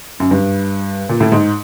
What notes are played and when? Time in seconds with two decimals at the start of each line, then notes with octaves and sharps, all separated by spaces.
0.20 F#2
0.31 G2
1.09 A#2
1.20 A2
1.32 G#2